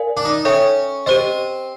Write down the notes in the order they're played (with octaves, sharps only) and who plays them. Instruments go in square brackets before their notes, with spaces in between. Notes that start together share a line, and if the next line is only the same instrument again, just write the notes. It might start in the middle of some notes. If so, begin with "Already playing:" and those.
Already playing: [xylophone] A#4 D5 F5 G#5
[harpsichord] D4
D#4
[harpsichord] C#4 [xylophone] A4 C#5 E5 G5
[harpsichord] C4 [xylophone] G4 C5 D#5